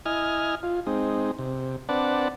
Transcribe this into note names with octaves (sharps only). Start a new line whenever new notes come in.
E4 D#5 G#5 F6
F4
G#3 C4 D#4
C3
C4 D4 B4 D5 F#5 A5